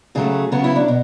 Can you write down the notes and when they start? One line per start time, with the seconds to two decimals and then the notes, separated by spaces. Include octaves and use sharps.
0.15 C#3 F#3 A3 G#4
0.52 C#3 F#3 B3 F#4
0.64 E4
0.76 D4
0.88 B2